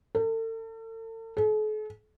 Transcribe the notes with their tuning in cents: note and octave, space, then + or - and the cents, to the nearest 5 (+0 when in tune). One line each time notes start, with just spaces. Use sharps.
A4 +40
A4 -45